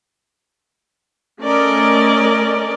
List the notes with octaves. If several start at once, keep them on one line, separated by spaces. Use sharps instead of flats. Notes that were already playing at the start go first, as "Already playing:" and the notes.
A3 C#4 A#4 D5 D#5